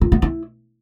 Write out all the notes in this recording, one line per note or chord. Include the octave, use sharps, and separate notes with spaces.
F4
B3
E4